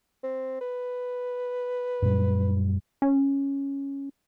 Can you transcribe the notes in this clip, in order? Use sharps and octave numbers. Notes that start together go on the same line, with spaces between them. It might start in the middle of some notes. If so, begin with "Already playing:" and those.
C4
B4
F#2 A#2 G3
C#4